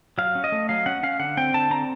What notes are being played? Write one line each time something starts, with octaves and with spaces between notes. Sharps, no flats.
F#3 F5
C#4
D#5
A3
F#3 F5
C#4 F#5
C#4 F5
D3 F#5
C4 G5
D3 A5
C4 A#5